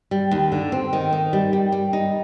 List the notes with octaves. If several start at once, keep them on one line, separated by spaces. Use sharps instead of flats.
G3
D#2
D3
C4
D#3
D#4
G3
G3
G3
D#4